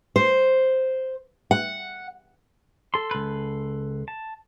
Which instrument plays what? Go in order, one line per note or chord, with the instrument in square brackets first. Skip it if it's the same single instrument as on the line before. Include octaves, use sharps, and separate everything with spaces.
[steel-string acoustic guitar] C5
F#5
[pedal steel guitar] A4 C6
[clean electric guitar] C#2 B4
[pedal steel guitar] A5